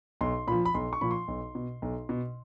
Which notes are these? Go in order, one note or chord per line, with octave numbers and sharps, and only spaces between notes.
B1 C6
A#2 F3 B5
B5
B1 C6
C#6
A#2 F3 B5
C6
B1
B2
B1
B2